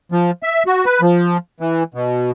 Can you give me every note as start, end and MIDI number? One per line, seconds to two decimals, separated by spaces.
0.12 0.31 53
0.43 0.63 76
0.67 0.84 66
0.86 1.01 71
1.02 1.37 53
1.60 1.83 52
1.94 2.31 47